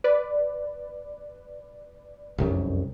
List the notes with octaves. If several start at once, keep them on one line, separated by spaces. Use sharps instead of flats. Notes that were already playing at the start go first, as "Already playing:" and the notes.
B4 D5
F1 C2 F#2